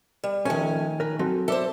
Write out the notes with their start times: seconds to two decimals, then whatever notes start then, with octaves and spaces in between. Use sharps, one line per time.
0.24 G3
0.45 D#3 F3 A3 C#4 G#5
1.00 A#4 B4
1.19 F#3 C4 A4
1.48 A4 C5 D5 E5